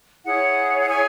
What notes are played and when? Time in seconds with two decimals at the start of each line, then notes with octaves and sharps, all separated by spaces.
0.25 E4 G#4 C#5 F#5
0.80 F#5
0.88 G#5